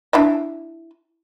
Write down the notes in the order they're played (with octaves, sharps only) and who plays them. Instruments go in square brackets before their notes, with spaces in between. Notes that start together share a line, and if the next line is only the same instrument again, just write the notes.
[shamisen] D4 E4 E5